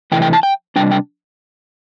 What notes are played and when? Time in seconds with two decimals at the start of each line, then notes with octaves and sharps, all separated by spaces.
0.12 C3 E3 A3 E4 G5
0.22 G5
0.33 A5
0.43 G5
0.76 C3 G3 D4 G5
0.91 G5